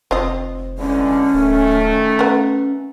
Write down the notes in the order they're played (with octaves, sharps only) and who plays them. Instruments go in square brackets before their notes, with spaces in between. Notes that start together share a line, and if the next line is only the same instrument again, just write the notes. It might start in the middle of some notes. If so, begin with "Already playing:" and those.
[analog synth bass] F1 [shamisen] C4 F4 D#5
[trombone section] E2 D3 G#3 [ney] C#4
[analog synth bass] D1 [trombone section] D#3 A3
[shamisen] B3 A#4 [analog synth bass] C#4